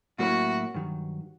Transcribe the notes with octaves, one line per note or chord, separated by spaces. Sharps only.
A2 F#3 A#3 C#4 E4 F#4
G2 D#3 F#3